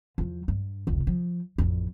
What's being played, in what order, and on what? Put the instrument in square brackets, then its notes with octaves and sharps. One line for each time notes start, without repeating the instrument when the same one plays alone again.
[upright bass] E2 F3
G2
F1 C#2
F3
A1 F2